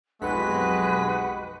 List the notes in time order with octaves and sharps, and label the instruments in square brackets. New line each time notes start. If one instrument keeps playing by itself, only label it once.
[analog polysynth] B1 F2 B6 [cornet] G#3 [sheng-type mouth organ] F#4 G4 F#5 [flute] B4